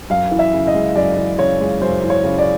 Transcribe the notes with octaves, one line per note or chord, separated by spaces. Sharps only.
F#2 F5
E3
E5
C#3
D#5
G#3
F#2 D5
E3
C#3 C#5
G#3
F#2 C5
E3
C#5
C#3
D5